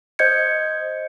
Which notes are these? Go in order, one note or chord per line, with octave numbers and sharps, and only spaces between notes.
C5 D#5 G6 G#6 C#7